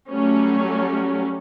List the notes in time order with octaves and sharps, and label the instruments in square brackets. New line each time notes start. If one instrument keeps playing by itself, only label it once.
[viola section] F#3 G3 A3 C#4